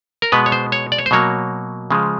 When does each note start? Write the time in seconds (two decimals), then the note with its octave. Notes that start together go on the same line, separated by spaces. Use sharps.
0.22 A#4
0.32 B2 G#3 B3 B4
0.46 C#5
0.52 C5
0.72 C#5
0.92 D5
0.98 C#5
1.06 C5
1.11 B2 F#3 A#3 C#5
1.91 C#3 F3 G#3